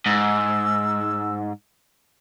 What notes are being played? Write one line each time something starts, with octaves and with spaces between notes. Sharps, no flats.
G#2 E6